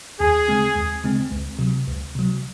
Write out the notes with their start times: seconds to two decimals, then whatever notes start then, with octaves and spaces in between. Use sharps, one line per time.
0.20 D#2 G#4
0.48 C#3 G#3 C4
0.76 D#2
1.04 C#3 G#3 C4
1.31 C#2
1.59 C3 F#3
1.87 C#2
2.15 C3 F#3